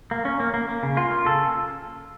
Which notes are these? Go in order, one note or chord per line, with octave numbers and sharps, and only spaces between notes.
A#3
C#4
A#3
A#3
A#3
C#3
A#3 F4
A#3
C#3 A4